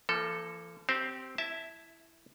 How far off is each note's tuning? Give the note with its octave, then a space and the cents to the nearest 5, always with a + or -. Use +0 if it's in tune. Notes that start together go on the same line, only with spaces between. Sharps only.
F3 -45 A#3 -5 A4 +0
C4 +0 G4 -25 C5 +0
E4 +5 E5 -15 A5 +0